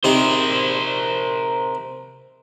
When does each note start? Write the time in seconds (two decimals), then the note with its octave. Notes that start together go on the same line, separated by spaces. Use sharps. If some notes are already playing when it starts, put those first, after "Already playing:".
0.04 C3 D#4 A#4 C5